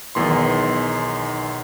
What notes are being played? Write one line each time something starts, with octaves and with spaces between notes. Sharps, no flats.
B1 E2 D#3 C6